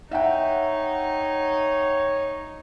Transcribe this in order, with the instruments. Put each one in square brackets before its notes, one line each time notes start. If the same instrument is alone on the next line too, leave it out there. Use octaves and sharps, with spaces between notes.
[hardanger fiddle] D#4 [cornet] C#5 [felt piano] E5 F#5 G5